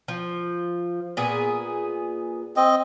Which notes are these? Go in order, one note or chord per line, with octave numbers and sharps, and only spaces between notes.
F3
A#2 B3 G#4
C4 D#5